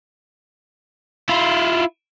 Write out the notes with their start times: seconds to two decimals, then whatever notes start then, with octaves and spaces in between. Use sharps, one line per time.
1.29 E4 F4